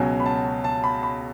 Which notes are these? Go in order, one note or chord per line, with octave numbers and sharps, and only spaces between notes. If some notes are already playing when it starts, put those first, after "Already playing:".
Already playing: C#2 B2 F#3 G#5
B5
A5
A5
B5
B5